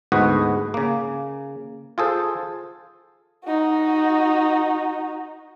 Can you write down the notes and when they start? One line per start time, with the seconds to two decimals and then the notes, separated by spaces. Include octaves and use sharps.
0.12 D2 G#2 B3 F#4 B4 D#5
0.74 C#3 A#3
1.98 F4 G#4 A4 C5
3.45 D#4 F#4